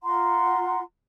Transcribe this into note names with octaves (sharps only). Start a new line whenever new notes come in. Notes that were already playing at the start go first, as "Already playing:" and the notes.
F4 F#5 A#5 C6